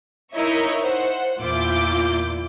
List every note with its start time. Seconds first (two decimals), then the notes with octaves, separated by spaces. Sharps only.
0.32 D#4 E4 A#4 C#5 D#5 E5
0.81 C5 F#5
1.39 E2 A#2 E4 F4 D6 G6